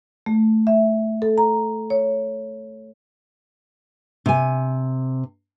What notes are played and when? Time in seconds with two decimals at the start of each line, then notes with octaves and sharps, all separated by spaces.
0.26 A3
0.67 E5
1.22 A4
1.38 A#5
1.90 C#5
4.26 C3 G#5